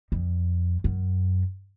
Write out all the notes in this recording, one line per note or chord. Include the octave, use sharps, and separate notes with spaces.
F2
F#2